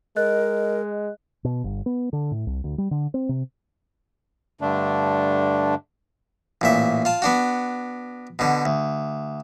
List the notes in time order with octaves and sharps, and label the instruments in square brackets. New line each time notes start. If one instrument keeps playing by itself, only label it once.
[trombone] G#3 [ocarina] A#4 [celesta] D#5 F#6
[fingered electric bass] B2
G1
B3
D3
A2
C2
D2
G3
D3
C4
C3
[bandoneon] G2 D3 A3 D4
[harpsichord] A1 A#2 E5
F4 A5
B3 D4 F#4
B2 D3
D2